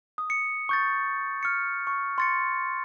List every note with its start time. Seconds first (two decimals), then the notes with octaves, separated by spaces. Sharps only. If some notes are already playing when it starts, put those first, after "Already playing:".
0.18 D#6
0.30 C#7
0.69 C#6 G6 A6
1.43 F6 C#7
1.87 C#6
2.18 C6 A6 C#7